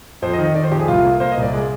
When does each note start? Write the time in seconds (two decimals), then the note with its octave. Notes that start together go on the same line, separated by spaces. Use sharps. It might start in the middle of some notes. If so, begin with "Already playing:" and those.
0.22 F2 C5
0.33 D#5
0.39 D#3
0.44 D#5
0.55 D#3 D5
0.64 C5
0.71 F2 G4
0.79 G#4
0.88 C2 F4
1.04 A#3
1.20 A#3 C5
1.32 D#5
1.38 C2
1.43 D5
1.53 G#3 D5